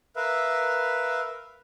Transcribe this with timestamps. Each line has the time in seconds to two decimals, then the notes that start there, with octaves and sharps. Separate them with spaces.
0.16 A#4 B4 E5 F5